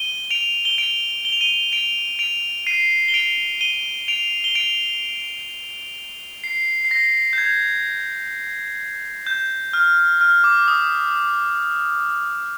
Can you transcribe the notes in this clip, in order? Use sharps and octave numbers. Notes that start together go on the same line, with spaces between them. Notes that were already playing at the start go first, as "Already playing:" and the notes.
Already playing: D#7 G7
D7 F7
G7
D7 F7
G7
F7
D#7 G7
D7 F7
D7 F7
C7 D#7
G7
D7 F7
D#7 G7
D7 F7
G7
D7 F7
C7
C7
A#6
G6
G#6
G6
F6
F6
D6
D#6